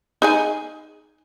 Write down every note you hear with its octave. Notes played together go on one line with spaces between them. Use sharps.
D#4 G#4 G#5